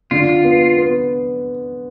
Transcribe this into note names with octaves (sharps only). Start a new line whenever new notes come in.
D3 F4
B3
B3